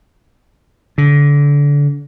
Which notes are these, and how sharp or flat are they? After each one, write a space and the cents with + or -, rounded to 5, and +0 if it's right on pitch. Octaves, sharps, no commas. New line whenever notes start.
D3 -30